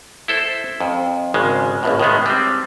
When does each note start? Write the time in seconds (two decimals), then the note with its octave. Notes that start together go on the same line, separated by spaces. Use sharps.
0.28 E4 A4 C5
0.80 F2
1.34 G#1 C#3 G#3
1.83 G#1 C#2 A2
2.00 A2 D#3 G#3 B3
2.26 G3 C4